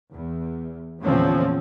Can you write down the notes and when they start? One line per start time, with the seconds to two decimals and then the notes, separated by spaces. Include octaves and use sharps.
0.12 E2
1.02 E2 A#2 D3 F3 C4 C#4